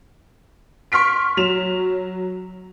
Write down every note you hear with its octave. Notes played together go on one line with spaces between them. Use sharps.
C6 C#6 F6 B6 D7
F#3 E7 F7